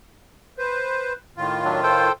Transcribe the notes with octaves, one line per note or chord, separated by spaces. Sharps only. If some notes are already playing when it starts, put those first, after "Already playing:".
B4 C5
A2 D#3 F4
F#3 D4
A4 C5 G5